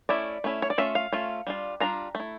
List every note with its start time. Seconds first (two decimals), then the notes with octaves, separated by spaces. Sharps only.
0.09 A3 C#4 E4 D5
0.44 A3 C#4 E4
0.62 C#5
0.70 D5
0.78 A3 C#4 F4 E5
0.95 F5
1.12 A3 C#4 F4
1.47 G3 D4 F4
1.80 G3 D4 F4 A#5
2.15 A3
2.20 E4